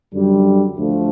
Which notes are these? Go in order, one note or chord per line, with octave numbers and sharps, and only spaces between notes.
F#2 D3 G3
D2 D3 F3 A3